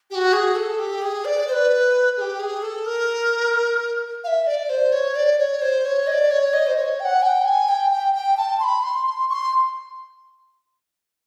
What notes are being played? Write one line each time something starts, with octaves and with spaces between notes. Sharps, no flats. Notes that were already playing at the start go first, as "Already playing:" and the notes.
G4
F#4
G#4
A4
G4
G#4
D5
C5
B4
G#4
G4
G#4
A4
A#4
F5
E5
D5
C5
C#5
D5
C#5
C5
C#5
D#5
D5
C#5
D#5
C5
C#5
G5
F#5
G#5
G5
G#5
G5
G5
G5
A5
C6
B5
C6
C6
C#6
C6